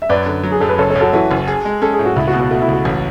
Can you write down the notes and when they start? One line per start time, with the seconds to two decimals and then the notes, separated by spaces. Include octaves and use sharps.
0.02 E5
0.09 F#2 B4 D5
0.26 D3
0.43 F#3
0.52 G#4
0.60 F#2 A4
0.69 B4
0.78 F#1 A4 C#5
0.90 A4 C#5
0.95 F#2
1.01 F#4 A4
1.13 E3 F#4 A4
1.31 F#1
1.47 G#4
1.65 G#3
1.82 C#4 A4
1.93 G#4
1.99 A2
2.05 F#4
2.16 C#2 E4
2.27 F#4
2.33 B2
2.40 F#4
2.50 A3 F#4
2.62 E4
2.68 C#2 F#4
2.85 A1